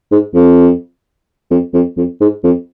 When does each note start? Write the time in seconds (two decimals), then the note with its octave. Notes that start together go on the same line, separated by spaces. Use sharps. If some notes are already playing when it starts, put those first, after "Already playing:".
0.12 G#2
0.35 F2
1.51 F2
1.74 F2
1.97 F2
2.20 G#2
2.44 F2